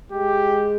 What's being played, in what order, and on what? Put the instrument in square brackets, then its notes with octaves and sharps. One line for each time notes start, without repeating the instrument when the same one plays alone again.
[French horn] G#3 [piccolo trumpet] G4